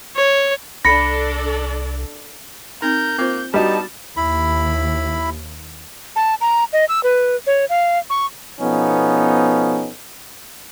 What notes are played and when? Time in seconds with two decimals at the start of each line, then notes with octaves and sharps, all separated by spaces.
0.15 C#5
0.85 C2 D4 A4 D5 B5 A#6 C#7
2.82 C4 D#4 A#4 G6
3.18 A#3 C4 F4 C5
3.54 G3 B3 D4 D#4 F#4 A5
4.17 D#2 E4 B5
6.16 A5
6.41 A#5
6.73 D#5
6.89 E6
7.03 B4
7.47 C#5
7.69 F5
8.10 C#6
8.60 B2 F3 B3 C#4 D#4 A4